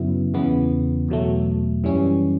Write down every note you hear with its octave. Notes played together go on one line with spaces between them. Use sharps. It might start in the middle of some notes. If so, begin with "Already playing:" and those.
Already playing: F#2 C#3 F#3 B3 E4
E2 C#3 E3 B3
E2 B2 F#3 A3
F#2 E3 G3 C#4